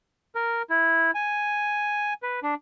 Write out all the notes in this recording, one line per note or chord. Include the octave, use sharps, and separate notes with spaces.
A#4
E4
G#5
B4
D4